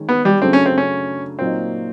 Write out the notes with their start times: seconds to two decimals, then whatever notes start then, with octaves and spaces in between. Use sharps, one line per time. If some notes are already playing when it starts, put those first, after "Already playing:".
Already playing: D#3 G#3 C#4
0.09 B3
0.25 G3
0.42 F#2 C#3 F#3 A3 C4 D4
0.53 C#4
0.66 C4
0.78 C#4
1.39 A#2 F#3 A#3 C4 D#4